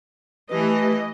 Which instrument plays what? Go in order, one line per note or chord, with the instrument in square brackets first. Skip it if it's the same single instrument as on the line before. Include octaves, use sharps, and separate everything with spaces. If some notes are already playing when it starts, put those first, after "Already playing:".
[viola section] E3 D#5 [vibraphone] A3 G4 B4